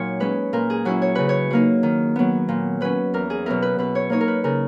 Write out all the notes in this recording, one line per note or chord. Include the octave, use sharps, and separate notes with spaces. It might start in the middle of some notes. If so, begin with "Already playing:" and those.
Already playing: A#2 F#3 A#3 D#4 C#5
G#3 C#4 B4
A#2 A#4
G#4
F#3 C#4 E4 F#4
C#5
C#3 B4
C#5
F#3 A#3 D#4
D#3
F#3 B3
A#2
F#3 C#4 B4
E2 A#4
G#4
B2 F#3 B3 E4 A#4
B4
B2 B4
C#5
A#3 D#4 C#5
A#4
B4
C#3 A#4